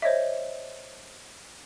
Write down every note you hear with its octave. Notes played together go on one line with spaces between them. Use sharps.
C5 C#5 D#5 E5